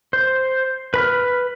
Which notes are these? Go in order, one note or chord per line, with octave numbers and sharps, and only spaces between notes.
C5
B4 B5 F6